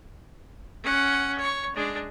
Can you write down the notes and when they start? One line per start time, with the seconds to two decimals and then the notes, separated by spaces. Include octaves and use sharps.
0.84 C#4 F#5
1.39 C#5 C#6
1.76 G#3 D4